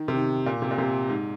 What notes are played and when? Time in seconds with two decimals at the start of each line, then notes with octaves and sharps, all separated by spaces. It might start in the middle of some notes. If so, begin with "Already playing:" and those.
Already playing: D#3
0.08 C3
0.15 D#3
0.46 A#2
0.62 C3
0.71 A#2
0.78 C3
1.09 G#2